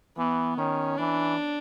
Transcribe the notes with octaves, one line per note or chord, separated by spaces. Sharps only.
E3 B3
D#3 C#4
E3 D4